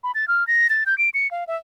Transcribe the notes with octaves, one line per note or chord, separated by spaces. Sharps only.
B5
A6
F6
A#6
A6
G6
D7
C#7
F5
E5